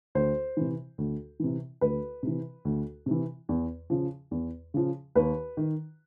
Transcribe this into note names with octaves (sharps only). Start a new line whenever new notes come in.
D2 C5
C3 E3
D2
C3 E3
D2 B4
C3 E3
D2
C3 E3
E2
C#3 F3
E2
C#3 F3
D#2 B4
D#3